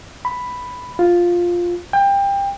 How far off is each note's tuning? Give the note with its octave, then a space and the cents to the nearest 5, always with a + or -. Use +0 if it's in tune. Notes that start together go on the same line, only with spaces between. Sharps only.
B5 +5
F4 +5
G5 +25